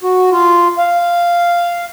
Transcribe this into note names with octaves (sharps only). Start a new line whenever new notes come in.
F#4
F4
F5